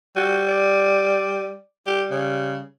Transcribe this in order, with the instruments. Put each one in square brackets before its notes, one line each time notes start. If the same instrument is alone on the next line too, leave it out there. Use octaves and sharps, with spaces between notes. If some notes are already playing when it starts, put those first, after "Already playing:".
[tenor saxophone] G3 [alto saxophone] F#4
[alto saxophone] D5
[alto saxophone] G3 [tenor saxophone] G4
[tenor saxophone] C#3